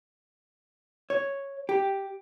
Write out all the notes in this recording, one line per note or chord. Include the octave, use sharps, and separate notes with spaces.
C#5
G4